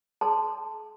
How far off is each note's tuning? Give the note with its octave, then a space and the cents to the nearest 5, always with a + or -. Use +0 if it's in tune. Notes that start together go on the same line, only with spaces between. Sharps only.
G#4 +45 A5 +0 C6 -15